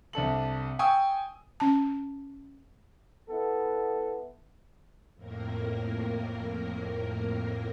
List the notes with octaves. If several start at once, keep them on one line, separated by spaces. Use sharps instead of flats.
C2 D4 A4 F#7
G5 G#5 C#6 D#6 E6
C#4 A5
B3 E4 A4
F2 A2 A#3 A#4